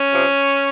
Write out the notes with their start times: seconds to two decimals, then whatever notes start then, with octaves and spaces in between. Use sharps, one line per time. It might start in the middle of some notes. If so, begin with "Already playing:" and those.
Already playing: C#4
0.11 C3 F3